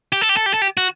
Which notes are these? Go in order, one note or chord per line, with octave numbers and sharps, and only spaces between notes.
G4
A4
G4
A4
G4
A4
G4
F#4